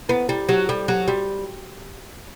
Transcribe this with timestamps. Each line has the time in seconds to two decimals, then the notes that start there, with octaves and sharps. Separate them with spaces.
0.09 B3 E4
0.29 G3 E4
0.49 F#3 G4
0.69 G3 A4
0.88 F#3 G4
1.08 G3 F#4